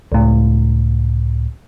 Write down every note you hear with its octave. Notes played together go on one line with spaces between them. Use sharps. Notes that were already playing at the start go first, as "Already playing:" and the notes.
C#2 A2